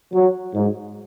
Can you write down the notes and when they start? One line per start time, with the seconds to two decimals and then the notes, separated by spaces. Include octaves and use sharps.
0.14 F#3
0.55 G#2